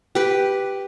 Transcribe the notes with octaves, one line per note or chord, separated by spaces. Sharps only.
G4 B4